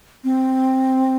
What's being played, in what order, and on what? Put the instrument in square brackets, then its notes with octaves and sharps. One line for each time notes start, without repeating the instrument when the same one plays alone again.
[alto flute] C4